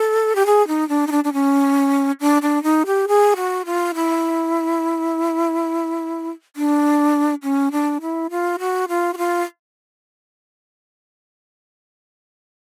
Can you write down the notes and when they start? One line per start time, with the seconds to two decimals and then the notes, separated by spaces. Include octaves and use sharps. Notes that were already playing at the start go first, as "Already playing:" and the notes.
Already playing: A4
0.35 G4
0.46 G#4
0.68 D#4
0.89 D4
1.07 D#4
1.12 D4
1.24 D4
1.33 C#4
2.20 D4
2.42 D4
2.63 D#4
2.86 G4
3.08 G#4
3.36 F#4
3.66 F4
3.95 E4
6.56 D4
7.43 C#4
7.72 D4
8.01 E4
8.30 F4
8.59 F#4
8.89 F4
9.14 F#4
9.18 F4